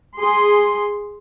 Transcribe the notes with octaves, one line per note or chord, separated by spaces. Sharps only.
G#4 C6